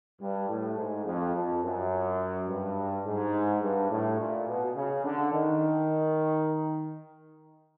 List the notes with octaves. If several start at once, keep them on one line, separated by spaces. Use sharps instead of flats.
G2
A2
G#2
F2
F2
F#2
G2
G#2
G2
A2
A#2
B2
C#3
D3
D#3